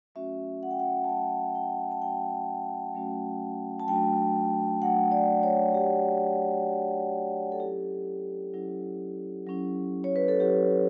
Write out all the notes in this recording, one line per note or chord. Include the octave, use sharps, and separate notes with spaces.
F#3 A3 C#4 F#4 E5
F#5
G5
F#5
A5
F#3 A3 C#4 F#4 G5
G5
A5
F#3 A3 C#4 F#4 G5
F#3 A3 C#4 F#4
A5
F#3 A3 D4 F#4 G5
F#3 A3 D4 F#4 F#5
D5
C#5
F#3 A3 D4 F#4 G4
F#3 A3 D4 F#4
A4
F#3 C#4 E4 G4
F#3 C#4 E4
F#3 C#4 E4
C#5
B4
A4
F#3 C#4 E4 G4